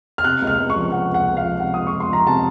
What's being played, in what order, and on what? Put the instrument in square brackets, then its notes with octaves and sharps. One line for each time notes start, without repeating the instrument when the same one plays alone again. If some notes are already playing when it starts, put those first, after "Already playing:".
[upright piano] F6
C3 F#6
C#2
F6
C#2
C#6
F3
C3 F#5
C#2
F#5
C#2
F5
F3
C3 F#5
C#2 D#6
C#6
C#2
C6
F3 A#5
C3 A5